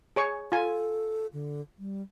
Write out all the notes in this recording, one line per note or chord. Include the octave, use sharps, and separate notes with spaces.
G#4 C#5 C#6
F4 A4 G#5
D3
G3